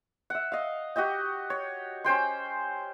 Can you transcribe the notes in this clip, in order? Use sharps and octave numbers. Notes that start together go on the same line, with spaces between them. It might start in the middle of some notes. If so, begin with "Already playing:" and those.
E5 F#5
D#5 F5
F#4 G4 D#5 G5
C#5
C#4 C5 G5 C6